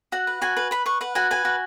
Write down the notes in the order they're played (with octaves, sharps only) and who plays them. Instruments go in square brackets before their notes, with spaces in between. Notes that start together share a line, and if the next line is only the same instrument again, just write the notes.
[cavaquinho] F#4 F#5
B4
F#4 G#5
B4
B4 B5
B4 C#6
B4 F#5
F#4 G#5
B4 G#5
F#4